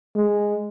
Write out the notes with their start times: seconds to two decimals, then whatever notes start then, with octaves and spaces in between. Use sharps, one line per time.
0.15 G#3